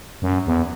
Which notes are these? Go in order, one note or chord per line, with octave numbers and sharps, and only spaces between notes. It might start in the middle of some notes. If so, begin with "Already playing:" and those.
F#2
E2